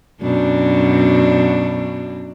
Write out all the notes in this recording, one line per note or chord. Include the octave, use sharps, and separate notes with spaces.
F#2 B2 D4